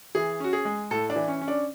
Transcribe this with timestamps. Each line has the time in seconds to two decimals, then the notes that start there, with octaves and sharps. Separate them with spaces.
0.15 E3 G#4
0.40 C#4 F#4
0.53 G#4
0.65 G#3
0.91 A2 A4
1.10 D4
1.16 E3
1.28 C#4
1.41 C#4
1.48 D4